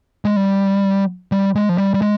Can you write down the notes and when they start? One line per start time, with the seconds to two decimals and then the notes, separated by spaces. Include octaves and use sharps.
0.25 G#3
0.36 G3
1.32 G3
1.55 G#3
1.69 F3
1.78 G3
1.94 G3
2.02 G#3